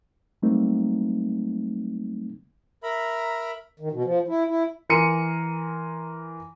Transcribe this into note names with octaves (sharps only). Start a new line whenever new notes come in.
F#3 G3 A3 A#3 C4 D#4
A#4 E5 A#5 B5
D#3
B2
F3
E4
E4
E3 A#4 C6 C#7 D#7